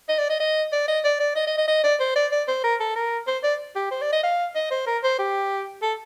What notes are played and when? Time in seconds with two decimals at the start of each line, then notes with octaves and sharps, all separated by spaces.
0.09 D#5
0.19 D5
0.30 D#5
0.40 D#5
0.72 D5
0.88 D#5
1.04 D5
1.20 D5
1.36 D#5
1.47 D#5
1.58 D#5
1.68 D#5
1.84 D5
2.00 C5
2.16 D5
2.32 D5
2.48 C5
2.64 A#4
2.80 A4
2.96 A#4
3.27 C5
3.43 D5
3.75 G4
3.91 C5
4.02 D5
4.13 D#5
4.23 F5
4.55 D#5
4.71 C5
4.87 A#4
5.03 C5
5.19 G4
5.82 A4